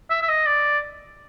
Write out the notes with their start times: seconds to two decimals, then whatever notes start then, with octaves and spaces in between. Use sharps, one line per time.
0.10 E5
0.22 E5
0.29 D#5
0.46 D5